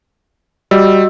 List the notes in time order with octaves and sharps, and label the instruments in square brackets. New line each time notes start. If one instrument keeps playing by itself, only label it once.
[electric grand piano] G3 [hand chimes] F#4 D#5 E6